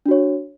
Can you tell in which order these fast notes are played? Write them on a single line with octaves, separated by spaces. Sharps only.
D4 F#4 C#5